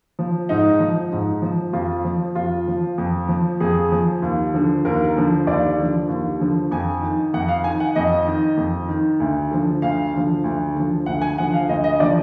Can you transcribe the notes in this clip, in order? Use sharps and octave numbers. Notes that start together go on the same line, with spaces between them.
F3
G#2 D#4
F3
G#2
F3
F2 F4
F3
F2 F4
F3
F2
F3
F2 G#4
F3
D#2
D3 F3
D#2 A#4
D3 F3
D#2 D5
D3 F3
D#2
D3 F3
F2 G#5
D#3
F2 F#5
F5
D#3 G#5
F#5
F2 D#5
D#3
F2
D#3
D2
D3 F3
D2 F5
D3 F3
D2
D3 F3
D2 F#5
G#5
D3 F3 F#5
F5
D2 D#5
D#5
D3 F3 D5